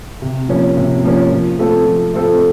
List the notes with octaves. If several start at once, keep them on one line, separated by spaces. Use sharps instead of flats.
C3
F3 A#3 C#4
C3
F3 A#3 C#4
F3
A3 C4 F4 A4
F3
A3 C4 F4 A4